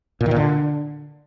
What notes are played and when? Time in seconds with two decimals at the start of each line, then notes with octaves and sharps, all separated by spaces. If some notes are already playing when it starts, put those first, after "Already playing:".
0.21 A#2
0.26 D#3
0.31 A#2
0.36 D3